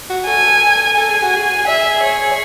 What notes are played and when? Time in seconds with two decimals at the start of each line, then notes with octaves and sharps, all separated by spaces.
0.10 F#4
0.27 A4 G#5
0.97 A4 G#5
1.10 G#4
1.23 F#4
1.35 G#4
1.67 E5
2.03 C#5